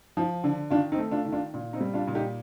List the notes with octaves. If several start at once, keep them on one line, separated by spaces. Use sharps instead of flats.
F3
D3
D#3 D4 F4
C4 D#4
A3
D4 F4
D#3
D4 F4
A#2
C4 D#4
G3
D4 F4
A#2
D#4 G4